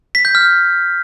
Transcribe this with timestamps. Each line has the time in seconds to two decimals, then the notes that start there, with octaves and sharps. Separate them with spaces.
0.15 B6
0.25 G6
0.35 F6